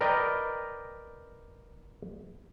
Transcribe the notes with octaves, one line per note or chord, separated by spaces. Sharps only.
A#4 B4 D5 D#5 G5 A#5